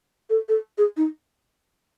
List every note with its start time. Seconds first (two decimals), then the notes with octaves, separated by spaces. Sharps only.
0.30 A4
0.49 A4
0.78 G#4
0.97 D#4